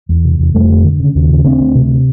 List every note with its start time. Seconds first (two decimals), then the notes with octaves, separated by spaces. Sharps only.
0.09 E2
0.25 C3
0.39 E2
0.54 F2 G3 A3
0.70 D3
0.84 D3
1.00 C#3
1.15 D#2
1.30 C#3
1.45 D2 C4 D4
1.60 D2
1.75 C3